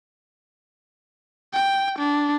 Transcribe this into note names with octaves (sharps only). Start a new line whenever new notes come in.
G5
D4